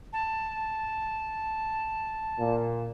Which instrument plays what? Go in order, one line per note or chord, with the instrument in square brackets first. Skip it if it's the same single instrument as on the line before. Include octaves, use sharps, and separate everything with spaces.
[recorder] A5
[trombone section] A#2